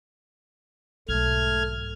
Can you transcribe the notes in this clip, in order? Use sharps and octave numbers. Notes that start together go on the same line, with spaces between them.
B1 G#2 A3 F6 G#6